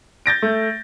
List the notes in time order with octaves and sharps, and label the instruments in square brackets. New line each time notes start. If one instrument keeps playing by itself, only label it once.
[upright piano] G6 A6 A#6 D7
A3